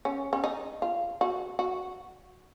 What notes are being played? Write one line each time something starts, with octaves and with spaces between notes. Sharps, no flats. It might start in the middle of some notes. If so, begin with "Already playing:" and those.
C#4
C#4
D#4
F4
F#4
F#4